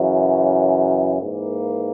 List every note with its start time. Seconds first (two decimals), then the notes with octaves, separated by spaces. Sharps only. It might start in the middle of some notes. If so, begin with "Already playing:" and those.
Already playing: F#2 C#3 E3
1.21 G#2 E3 A#3